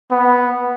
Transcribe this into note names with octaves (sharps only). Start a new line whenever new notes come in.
B3